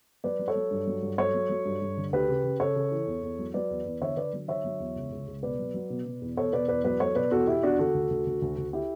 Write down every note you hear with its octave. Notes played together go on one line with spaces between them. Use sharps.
F#3 B4 D5
F#3
A4 C#5
F#3
G2
F#3
G2
F#3 A4 C#5
F#3
F#3
G2
G2
D3
D2 G4 B4
C#3
C#3
C#3 A4 C#5
C#3
E3
E2
E2
F#3
F#3 B4 D5
E2
E2
D3 C#5 E5
D3 B4 D5
F#3
D3 C#5 E5
F#3
E2
C#2
C#2
C#2
B2 B4 D5
F#3
F#3
B2
B2
E2
E2 A4 C#5
B2 B4 D5
E2 B4 D5
F#3 B4 D5
F#3 A4 C#5
B2 B4 D5
E2 F#4 A4
B2 E4 G4
E2 D4 F#4
D3 F#4 A4
D2
D2
D2
D2
D2
E4 G4